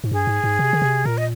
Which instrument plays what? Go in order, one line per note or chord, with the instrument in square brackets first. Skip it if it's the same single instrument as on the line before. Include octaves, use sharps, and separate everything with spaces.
[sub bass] G#2
[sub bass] G2 [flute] G#4
[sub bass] G#2
G#2
C3
D3
C3
[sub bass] A#2 [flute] A#4
[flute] D#5